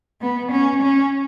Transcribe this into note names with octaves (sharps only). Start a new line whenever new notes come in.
B3
C#4
C#4